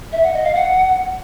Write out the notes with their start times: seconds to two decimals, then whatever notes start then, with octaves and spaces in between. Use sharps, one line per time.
0.12 E5
0.23 F#5
0.33 D#5
0.44 F5
0.55 F#5